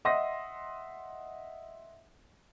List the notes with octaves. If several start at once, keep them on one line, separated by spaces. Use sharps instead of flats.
D#5 E5 F#5 C6 D#6 A#6